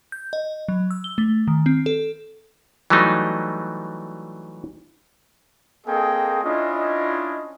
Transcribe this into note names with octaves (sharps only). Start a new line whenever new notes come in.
G6
D#5
F#3
E6
G7
A3
D#3
C4
A4
E3 F#3 G3 A3 D#4
A#3 C4 G#4 A4 D#5 G5
C#4 D4 E4 F4 D#5